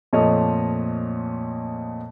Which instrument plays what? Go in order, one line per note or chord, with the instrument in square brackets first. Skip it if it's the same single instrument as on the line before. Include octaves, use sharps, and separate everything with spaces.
[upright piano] F2 A#2 F3 A3 C#5 D#5